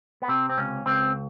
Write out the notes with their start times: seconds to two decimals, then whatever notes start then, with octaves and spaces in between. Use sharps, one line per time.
0.22 B3
0.28 C3 C4
0.49 C4
0.58 C#2 C#4
0.86 C#2 C4